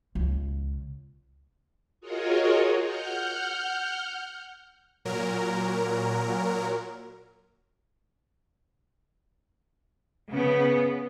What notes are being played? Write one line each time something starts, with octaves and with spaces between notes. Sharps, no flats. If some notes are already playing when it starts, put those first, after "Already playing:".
C#2
F4 F#4 G#4 A#4 C#5 D#5
F#5 F6 G6
A#2 F#3 A#4
C#3 B3